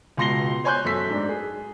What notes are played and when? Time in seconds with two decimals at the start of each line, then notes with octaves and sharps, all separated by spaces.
0.17 C#2 B2 C6 A#6 C7 G7
0.64 C5 C#5 G#5 C6 F#6 G6
0.84 F#2 A3 A4 E6 B6
1.10 G#2 D4
1.29 G#4